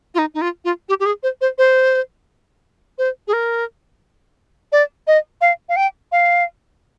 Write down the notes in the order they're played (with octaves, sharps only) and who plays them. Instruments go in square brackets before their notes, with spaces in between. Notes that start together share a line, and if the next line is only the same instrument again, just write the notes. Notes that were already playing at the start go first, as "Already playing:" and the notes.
[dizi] F4
D#4
D#4
F4
F4
G4
G4
G#4
C5
C5
C5
C5
G#4
A#4
D5
D#5
F5
F5
G5
F5